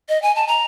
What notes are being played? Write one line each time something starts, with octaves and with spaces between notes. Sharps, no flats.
D#5
G#5
A5
A#5